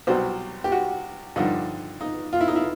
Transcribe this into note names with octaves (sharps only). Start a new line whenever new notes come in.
C2 B2 F#3 C5
G4
F#4
G2 D3 F3 D#4
D#4
F4
E4
D#4
E4